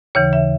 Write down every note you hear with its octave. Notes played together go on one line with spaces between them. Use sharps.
D#2 C#3 E3 C#5
E5